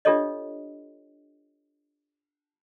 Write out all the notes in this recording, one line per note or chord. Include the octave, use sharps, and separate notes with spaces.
D4 F4 G4 A4 C#5 D#5